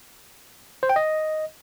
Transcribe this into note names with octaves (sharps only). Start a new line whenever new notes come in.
C5
G5
D#5